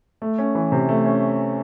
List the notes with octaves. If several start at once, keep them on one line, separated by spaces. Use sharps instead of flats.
A3
C#4
E3
C3
A3
C#4